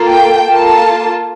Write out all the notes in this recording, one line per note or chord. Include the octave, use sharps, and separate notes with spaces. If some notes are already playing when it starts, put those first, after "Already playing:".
Already playing: A#3 F4 A4
G5
A#3 F4 A4 A5